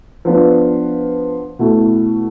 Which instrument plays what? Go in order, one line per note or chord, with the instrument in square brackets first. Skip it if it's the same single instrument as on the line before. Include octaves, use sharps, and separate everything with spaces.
[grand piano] F3 B3 D4 F4 B4
B2 A3 E4